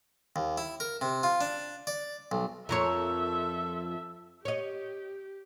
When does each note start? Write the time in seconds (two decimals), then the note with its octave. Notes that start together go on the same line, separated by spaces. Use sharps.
0.36 D#2
0.58 E4
0.80 A#4
1.01 C3
1.23 F4
1.41 D4
1.87 D5
2.32 B1
2.69 F2 A4 A#4 C#5 E5
4.45 G4 C#5 D#5